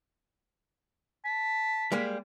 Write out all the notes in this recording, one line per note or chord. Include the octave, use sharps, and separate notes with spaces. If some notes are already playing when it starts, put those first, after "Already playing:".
A5 B6
G3 G#3 A#3